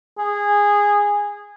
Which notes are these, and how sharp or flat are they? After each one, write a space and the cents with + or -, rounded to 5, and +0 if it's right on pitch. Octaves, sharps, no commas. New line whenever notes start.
G#4 -15